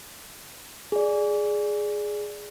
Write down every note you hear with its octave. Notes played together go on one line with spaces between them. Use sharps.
G#4 D5